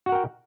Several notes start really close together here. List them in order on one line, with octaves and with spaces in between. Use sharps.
F#4 F#5 A#4 G5